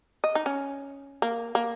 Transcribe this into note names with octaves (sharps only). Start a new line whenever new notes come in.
D#5
D#4
C#4
A#3
A#3